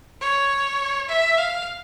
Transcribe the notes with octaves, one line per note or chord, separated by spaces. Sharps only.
C#5
E5
F5